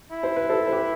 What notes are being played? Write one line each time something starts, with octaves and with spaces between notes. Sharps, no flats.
E4
C5
B4
A4 C5
C5
G4 B4